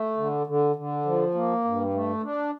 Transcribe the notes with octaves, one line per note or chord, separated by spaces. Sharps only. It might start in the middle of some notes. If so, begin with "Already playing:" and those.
Already playing: A3
D3
D3
D3
F3
A#3
G2
A3
D4